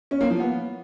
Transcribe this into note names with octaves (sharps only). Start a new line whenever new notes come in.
C#4
A#3
F3
B3